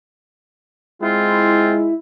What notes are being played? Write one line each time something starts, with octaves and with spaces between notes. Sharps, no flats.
G#3 C4 E4 F4